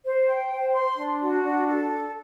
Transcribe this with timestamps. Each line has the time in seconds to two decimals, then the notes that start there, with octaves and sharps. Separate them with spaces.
0.03 C5
0.27 G5
0.50 C5
0.74 C6
0.96 D4
1.21 F#4
1.43 D4
1.67 A4